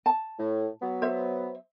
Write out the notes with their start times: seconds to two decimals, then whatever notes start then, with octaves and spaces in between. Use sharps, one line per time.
0.06 A5
0.39 A2
0.81 F#3 B3
1.02 C5 E5